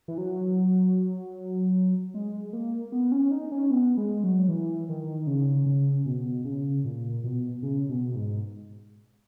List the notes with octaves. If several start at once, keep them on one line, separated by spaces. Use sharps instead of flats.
E3
F#3
G#3
A#3
B3
C#4
D#4
C#4
B3
G#3
F#3
E3
D#3
C#3
C#3
B2
C#3
A#2
B2
C#3
B2
G#2